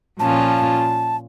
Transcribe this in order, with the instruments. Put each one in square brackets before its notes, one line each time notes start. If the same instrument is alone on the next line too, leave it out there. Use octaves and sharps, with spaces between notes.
[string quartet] A#2 F3 C#4 F4 [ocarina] A5